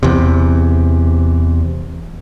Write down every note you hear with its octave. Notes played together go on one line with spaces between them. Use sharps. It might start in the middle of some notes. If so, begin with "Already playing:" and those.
E2 C3